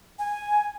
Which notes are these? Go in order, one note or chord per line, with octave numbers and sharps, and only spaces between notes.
G#5